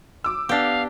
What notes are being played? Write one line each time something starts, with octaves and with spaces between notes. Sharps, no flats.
D6 E6
B3 D4 G4 F5